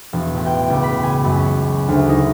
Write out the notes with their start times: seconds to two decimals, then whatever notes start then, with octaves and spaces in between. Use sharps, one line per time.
0.13 E1
0.34 A1
0.46 G5
0.70 C#2
0.83 B5
1.03 G#5
1.24 F#2
1.36 C#4
1.88 D2
2.09 D#4